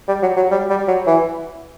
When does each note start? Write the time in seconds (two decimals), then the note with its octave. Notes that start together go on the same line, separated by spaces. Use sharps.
0.08 G3
0.23 F#3
0.37 F#3
0.51 G3
0.70 G3
0.88 F#3
1.07 E3